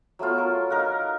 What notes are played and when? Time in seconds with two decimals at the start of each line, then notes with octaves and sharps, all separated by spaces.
0.19 F#3 A3 B3 F4
0.38 A#4
0.70 D#4 A#4 F5 F#5